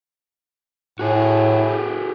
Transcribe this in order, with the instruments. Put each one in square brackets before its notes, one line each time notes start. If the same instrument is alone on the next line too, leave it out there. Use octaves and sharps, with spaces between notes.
[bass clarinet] A2 [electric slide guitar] F#4 G#4 A4